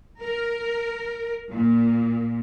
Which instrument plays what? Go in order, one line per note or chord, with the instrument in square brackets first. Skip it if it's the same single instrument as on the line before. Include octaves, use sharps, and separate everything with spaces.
[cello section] A#4
A#2